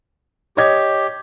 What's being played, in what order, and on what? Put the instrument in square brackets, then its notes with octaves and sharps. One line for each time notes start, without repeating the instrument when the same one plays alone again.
[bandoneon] G4 [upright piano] C#5 D#5 G#6